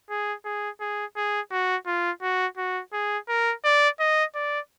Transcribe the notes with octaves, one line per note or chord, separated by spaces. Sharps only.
G#4
G#4
G#4
G#4
F#4
F4
F#4
F#4
G#4
A#4
D5
D#5
D5